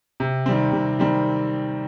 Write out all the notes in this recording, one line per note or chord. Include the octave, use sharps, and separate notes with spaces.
C3
D#3 G3 C4
C3
D#3 G3 C4